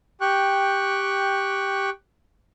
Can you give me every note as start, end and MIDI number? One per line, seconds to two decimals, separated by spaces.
0.21 1.90 67
0.21 1.90 79
0.21 1.90 85
0.21 1.90 90